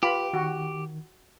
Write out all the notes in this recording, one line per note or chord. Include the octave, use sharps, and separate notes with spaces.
F4 G4 B4 B5
D#3 F#4